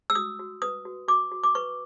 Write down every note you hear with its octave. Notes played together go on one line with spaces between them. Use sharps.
E6
F#4 D#6
F#4
B4 D#6
F#4
F#4 D6
F#4
D6
B4 C#6